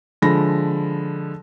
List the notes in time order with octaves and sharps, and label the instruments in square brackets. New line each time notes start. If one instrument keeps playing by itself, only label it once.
[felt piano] D3 F3 G#3 B5 A#6